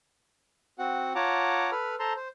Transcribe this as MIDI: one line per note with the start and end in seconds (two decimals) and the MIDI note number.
0.79 1.13 60
0.79 1.13 66
0.79 1.13 78
1.15 1.70 65
1.15 1.70 73
1.15 1.70 78
1.15 1.70 81
1.15 1.70 82
1.15 1.70 86
1.72 1.95 69
1.72 1.95 71
1.72 1.95 83
1.72 1.95 89
1.99 2.13 69
1.99 2.13 72
1.99 2.13 81
1.99 2.13 82
1.99 2.13 84
2.16 2.28 72